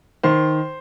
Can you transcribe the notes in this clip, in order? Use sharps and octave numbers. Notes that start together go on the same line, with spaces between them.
D#3 C5